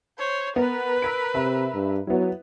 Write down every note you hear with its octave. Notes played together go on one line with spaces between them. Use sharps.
C5 C#5
B3 A#4 B4
E6 B6 D7
C3 E5 B5
G2
F#3 B3 E4